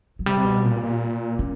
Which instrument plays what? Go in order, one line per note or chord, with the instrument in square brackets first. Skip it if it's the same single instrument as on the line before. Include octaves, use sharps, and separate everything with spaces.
[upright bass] F#3
[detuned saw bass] C3 [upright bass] G3
[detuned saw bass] C3
B2
A#2
A#2
[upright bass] C#4